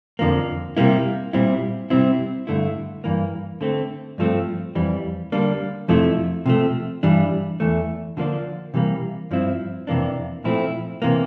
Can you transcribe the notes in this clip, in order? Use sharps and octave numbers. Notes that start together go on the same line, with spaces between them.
F2 D3 F3 A#3
C3 G3 A#3 E4
A#2 G3 C4 E4
C3 G3 C4 E4
G2 D3 A3 E4
G2 E3 A#3
D3 A3 C4
G2 F3 A3 C4
F2 E3 G3
D3 G3 A#3 D4
F2 C3 F3 A3 E4
C3 F3 A3
G2 E3 G3 D4
E2 E3 A3
D3 F3 A#3 D4
C3 E3 G3 A#3
G2 F3 C4 E4
F2 C3 E3 A#3 D4
A#2 F3 A3 C4 E4
C3 E3 A#3